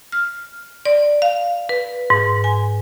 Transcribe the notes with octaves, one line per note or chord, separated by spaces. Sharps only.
F6
D5
F5
B4
G#2
G#5